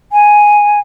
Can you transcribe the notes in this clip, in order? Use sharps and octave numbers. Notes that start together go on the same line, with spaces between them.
G#5